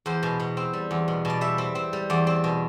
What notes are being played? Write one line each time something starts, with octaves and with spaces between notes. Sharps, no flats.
E2 C5
B2
B2
C4
G3
E2
B2
B2 D5
G3 E5
C4
C4
G3
E2 D5
C4
B2